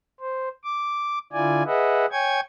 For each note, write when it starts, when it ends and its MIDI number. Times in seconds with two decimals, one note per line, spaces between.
0.20 0.49 72
0.64 1.19 86
1.33 1.63 50
1.33 1.63 64
1.33 1.63 65
1.33 1.63 74
1.33 1.63 80
1.66 2.06 68
1.66 2.06 71
1.66 2.06 75
1.66 2.06 76
1.66 2.06 78
2.11 2.40 73
2.11 2.40 79
2.11 2.40 80
2.11 2.40 85
2.11 2.40 92